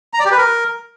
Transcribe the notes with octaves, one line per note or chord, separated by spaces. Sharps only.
A#5
D5
G4
B4
A#4